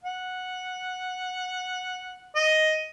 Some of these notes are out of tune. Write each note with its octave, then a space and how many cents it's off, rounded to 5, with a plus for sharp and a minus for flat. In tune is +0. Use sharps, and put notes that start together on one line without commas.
F#5 -10
D#5 +5